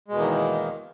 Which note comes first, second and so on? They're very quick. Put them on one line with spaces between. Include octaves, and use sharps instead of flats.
G#3 B2 E2 A#3 D#3